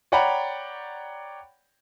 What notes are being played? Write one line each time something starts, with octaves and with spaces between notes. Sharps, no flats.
C#5 D5 F#5 G5 A#5 B5